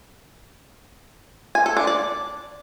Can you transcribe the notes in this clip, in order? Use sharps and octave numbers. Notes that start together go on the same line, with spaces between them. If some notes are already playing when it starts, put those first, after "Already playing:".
G#5
A4
D4
D5